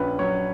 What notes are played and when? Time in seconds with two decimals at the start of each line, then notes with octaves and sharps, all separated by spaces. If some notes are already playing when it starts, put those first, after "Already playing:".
Already playing: A#1 C#4 B4
0.19 F#3 C#5